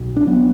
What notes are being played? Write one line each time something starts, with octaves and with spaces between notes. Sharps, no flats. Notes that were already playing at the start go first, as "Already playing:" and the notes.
Already playing: B1 B2
D4
F#3 B3